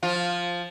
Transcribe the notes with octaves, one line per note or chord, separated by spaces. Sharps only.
F3 F4